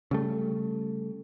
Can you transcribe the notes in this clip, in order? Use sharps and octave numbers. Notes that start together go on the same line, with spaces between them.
C#3 G3 A3